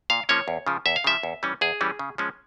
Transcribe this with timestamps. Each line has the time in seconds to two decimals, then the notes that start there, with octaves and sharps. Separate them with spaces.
0.10 A#2 F5
0.29 F3 A#3 C#4 C#5
0.48 E2
0.67 C#3 F3
0.86 E2 E5
0.96 F5
1.04 C#3 F3 E5
1.23 E2
1.43 E3 G3 C#4
1.61 E2 G#4
1.81 E3 G3 C#4
1.99 C#3
2.18 F3 G#3 C#4